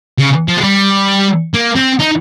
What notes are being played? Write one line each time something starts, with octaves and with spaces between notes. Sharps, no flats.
C#3
F3
G#3
G3
A#3
C4
D#4